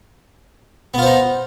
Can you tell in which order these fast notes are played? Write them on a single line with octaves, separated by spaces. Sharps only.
B3 F4 C5 D#4